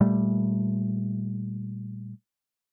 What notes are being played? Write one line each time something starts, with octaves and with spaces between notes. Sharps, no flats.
A#2 G3 A3